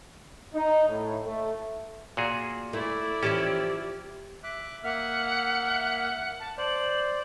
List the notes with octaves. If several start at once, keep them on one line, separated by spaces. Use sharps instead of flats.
D#4
A2
A3
A#2 F#4 G#4
A3 E4 D5
E3 F3 C#4 G4 A5
E5 D6 F#6
A#3 E5 F#5 F6
A5
C5 D5 F#7